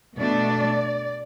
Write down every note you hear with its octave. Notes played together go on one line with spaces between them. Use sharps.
B2 A3 D4 D5